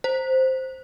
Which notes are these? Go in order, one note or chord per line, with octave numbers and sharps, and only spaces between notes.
C5